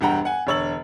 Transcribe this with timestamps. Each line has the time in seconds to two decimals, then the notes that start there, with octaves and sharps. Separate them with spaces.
0.01 E1 G2 G3 F#5 G5 A#5
0.25 F#5 G#5
0.47 E1 D3 C#5 E6 A6 F#7